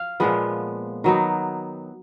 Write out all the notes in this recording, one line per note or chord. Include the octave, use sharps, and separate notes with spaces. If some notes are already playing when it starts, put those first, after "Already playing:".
Already playing: F5
A#2 F3 G#3 B3
D#3 F#3 B3 D#4